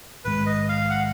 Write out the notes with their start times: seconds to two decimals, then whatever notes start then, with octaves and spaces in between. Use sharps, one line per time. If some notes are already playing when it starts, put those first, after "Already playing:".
0.25 A#1 G#2 D#3 G#3 B4
0.46 D#5
0.69 F5
0.90 F#5